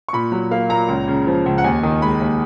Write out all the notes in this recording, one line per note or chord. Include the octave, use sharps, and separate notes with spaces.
C#6
A#2 B5
F#3
A#3 F5
A#2 A#5
C#2
C#3
F3
C#2
F#5
D#2 G#5
D#3
G#3 B5
D#2